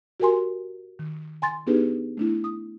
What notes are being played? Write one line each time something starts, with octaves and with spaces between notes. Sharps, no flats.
F#4 G4 A#4 G#5 C6
D#3
G#5 C6 A6
B3 D4 D#4 G4 G#4 B4
A3 D4 E4
D#6